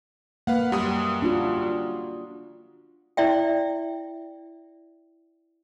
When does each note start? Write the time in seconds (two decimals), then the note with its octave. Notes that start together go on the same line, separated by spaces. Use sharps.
0.47 A#3 B4 F5 F#5
0.72 F#2 G3 G4 D#6
1.22 D4 F4 F#4
3.17 E4 D5 E5 G5